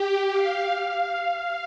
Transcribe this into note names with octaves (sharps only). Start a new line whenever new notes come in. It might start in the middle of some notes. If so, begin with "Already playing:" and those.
Already playing: G4
F5
F5
F5